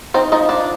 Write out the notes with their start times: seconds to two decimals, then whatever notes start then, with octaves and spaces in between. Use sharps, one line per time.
0.14 C4 D#4 C5
0.32 F3 D#4 D#5
0.49 F3 D4 D5